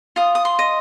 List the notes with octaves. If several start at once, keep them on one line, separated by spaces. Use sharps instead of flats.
F4 D#6
D#6
C6
D#5